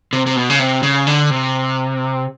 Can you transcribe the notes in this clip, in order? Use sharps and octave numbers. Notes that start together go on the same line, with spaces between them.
C3
C3
B2
C#3
C3
C#3
D3
C3